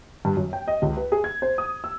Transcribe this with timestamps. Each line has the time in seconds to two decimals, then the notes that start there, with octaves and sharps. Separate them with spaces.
0.25 G2
0.37 F#2
0.53 G5
0.68 D#5
0.82 C#2
0.97 B4
1.12 G#4
1.24 G#6
1.42 C5
1.58 D#6
1.84 E6